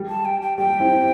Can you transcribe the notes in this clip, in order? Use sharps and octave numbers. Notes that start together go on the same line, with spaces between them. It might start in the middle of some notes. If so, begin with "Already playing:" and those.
Already playing: G3
A5
G5
G5
G3 G5
C4 E4